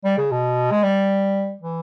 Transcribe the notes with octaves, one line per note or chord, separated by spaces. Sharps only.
G3
C#3
B2
G#3
G3
E3